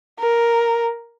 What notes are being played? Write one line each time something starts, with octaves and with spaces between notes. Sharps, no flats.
A#4